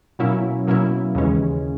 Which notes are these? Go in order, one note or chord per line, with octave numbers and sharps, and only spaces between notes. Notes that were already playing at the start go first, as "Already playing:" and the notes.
B2 F#3 A#3 C#4 E4
B2 F#3 A#3 C#4 E4
D#2 C#3 E3 G#3 C#4